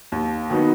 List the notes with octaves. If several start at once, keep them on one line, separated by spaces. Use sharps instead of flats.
D#2
D#3 F#3 B3 D#4